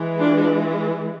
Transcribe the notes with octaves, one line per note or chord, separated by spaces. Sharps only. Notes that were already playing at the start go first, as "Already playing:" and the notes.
Already playing: E3 G#3
D4 F4